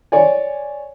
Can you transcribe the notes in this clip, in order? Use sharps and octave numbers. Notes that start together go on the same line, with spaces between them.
C#5 D5 G#5